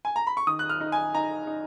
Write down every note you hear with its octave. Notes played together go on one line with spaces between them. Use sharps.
G#5
A#5
B5
C#6
D#3 D#6
F#6
F6
D#4
G#5
D#4 A#5
D#4